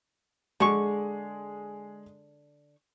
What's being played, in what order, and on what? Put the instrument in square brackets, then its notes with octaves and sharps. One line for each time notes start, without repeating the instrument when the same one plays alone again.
[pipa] D3 C#6 [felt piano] G#3 G#4